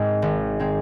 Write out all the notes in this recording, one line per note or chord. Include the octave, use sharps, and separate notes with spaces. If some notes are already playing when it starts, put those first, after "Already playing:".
Already playing: G#2 G#3 C4 A#4 G#5
G#1
G#3 C4